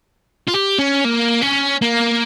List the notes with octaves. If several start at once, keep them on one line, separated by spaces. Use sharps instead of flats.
F4
G4
C#4
A#3
C#4
A#3